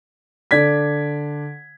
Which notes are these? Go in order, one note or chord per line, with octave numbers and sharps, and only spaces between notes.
D3 D5 G#6 B6